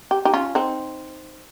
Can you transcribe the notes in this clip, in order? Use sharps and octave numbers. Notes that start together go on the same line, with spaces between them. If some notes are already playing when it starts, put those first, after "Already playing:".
G4
D#4 G4
C#4 F4
C4 D#4